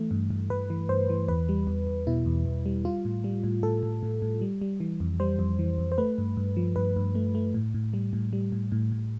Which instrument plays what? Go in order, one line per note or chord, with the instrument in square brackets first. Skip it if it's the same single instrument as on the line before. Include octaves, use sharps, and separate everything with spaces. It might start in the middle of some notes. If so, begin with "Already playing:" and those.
Already playing: [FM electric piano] E3 A3
G2
G2
G2 B4
E3
G2 C5
E3
E2 B4
G3
E2
E2
B2 E4
E2
E2
G3
G3 F4
A2
G3
A2
A2 A4
A2
A2
A2
G3
G3
E3
F2
G3 C5
F2
E3
F2
C5
A3 B4
G2
G2
F3
G2 B4
G2
A3
A3
A2
A2
G3
A2
G3
A2
A2
A2